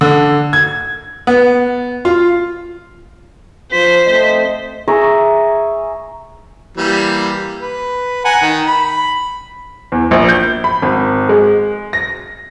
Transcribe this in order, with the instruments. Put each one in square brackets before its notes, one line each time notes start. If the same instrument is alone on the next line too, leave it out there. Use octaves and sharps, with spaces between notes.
[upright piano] D3
G#6
B3
F4
[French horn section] F3 [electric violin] C5 [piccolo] B6
[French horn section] A3 C4 D#5 [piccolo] B6
[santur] G#4 E5 A#5 C#6
[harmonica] E3 G3 A#3
B4
F#5 G#5 A#5
D#3
B5
[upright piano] E2
A#1
G6
B5
G#1
G#3
A#6